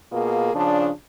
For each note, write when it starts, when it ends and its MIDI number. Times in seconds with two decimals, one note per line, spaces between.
0.12 0.53 47
0.12 0.53 58
0.12 0.53 65
0.12 0.53 68
0.54 0.89 49
0.54 0.89 53
0.54 0.89 62